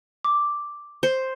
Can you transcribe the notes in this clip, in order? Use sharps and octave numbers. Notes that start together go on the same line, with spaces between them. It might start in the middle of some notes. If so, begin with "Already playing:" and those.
D6
C5